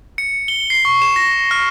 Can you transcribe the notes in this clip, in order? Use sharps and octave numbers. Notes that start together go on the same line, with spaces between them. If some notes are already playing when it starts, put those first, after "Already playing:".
C#7
G7
C7
C#6
E7
A#6
F6